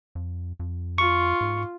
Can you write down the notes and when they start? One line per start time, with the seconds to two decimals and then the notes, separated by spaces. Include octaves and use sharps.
0.15 F2
0.60 F2
0.98 F4 C#6
1.41 G#2